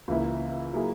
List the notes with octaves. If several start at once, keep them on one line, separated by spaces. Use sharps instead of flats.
C#2 C#3 E3 A#3 E4
F#3 A#3 E4 G#4